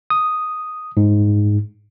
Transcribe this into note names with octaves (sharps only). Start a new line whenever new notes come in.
D#6
G#2